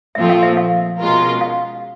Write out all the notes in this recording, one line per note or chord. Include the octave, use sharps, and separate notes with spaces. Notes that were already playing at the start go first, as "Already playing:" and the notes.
A#2 F3 A3 C4 F4 E5
F5
E5
F5
B2 G#3 C#4 F4 A#4
F5